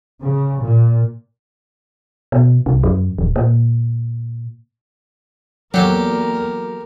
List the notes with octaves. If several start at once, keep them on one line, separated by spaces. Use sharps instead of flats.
C#3
A#2
B2
C2
F#2
D1
A#2
E2 F#3 A#3 G4 A4 A#4